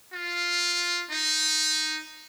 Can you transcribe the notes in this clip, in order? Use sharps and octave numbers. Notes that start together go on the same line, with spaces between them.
F4
D#4